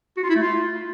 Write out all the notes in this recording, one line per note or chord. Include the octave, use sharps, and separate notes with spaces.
F#4
F4
E4
A3
F4